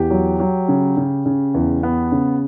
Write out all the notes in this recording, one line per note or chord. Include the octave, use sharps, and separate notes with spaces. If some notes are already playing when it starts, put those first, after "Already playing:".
Already playing: E2 G4 G5
F#3
F#3
C#3
C#3
C#3
E2
B3
C#3